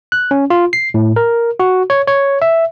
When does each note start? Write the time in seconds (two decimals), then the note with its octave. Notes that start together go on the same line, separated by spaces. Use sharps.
0.12 F#6
0.31 C#4
0.50 F4
0.73 C7
0.94 A2
1.16 A#4
1.60 F#4
1.90 C#5
2.08 C#5
2.42 E5